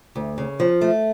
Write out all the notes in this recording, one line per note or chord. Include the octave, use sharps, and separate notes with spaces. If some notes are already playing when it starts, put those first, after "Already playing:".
D2
C#3
F3
A3